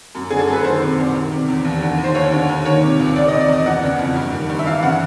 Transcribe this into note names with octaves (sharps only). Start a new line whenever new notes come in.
F#2
D3 G#4
A4
F#2 B4
D#3 C5
C3
C2
D#3
C3
E2
D#2
D3
D#2
C5
D#2 C#5
D3
D#2
D#3 C#5
C3
C#2
D#3 D5
D#5
C3
D5
E2 D#5
E3 F#5
C#3
F2
G2
D#3
G2
E5
E3 F5
C#3 F#5